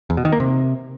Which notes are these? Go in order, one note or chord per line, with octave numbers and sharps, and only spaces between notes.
E2
B2
D#3
A#3
C3